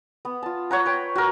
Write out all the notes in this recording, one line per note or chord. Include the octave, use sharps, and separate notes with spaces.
B3
F4 A5
C#5 F#5 A#5
B4 G5
F#4 A#4